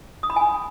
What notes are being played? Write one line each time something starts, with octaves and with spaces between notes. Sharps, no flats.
D#6
B5
G#5